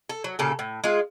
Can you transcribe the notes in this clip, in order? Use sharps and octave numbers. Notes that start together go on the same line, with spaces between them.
A4
F#3
A#2 C#3 G4 A4
A2
G#3 F4